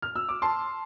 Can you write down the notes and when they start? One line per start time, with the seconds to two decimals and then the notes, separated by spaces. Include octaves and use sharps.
0.02 F6
0.15 E6
0.29 D6
0.42 A5 C6